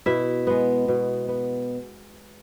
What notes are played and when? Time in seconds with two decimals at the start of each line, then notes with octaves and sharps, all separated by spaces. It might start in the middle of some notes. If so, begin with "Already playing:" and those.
0.06 B2 E4 E5
0.47 G#3 B3
0.88 B2
1.28 B3